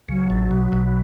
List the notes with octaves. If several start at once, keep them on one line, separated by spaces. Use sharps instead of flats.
C#2 C#3 F#3
A1 A2
B1 B2
B1 B2